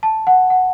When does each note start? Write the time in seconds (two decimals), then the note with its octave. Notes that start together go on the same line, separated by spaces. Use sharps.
0.03 A5
0.27 F#5
0.50 F#5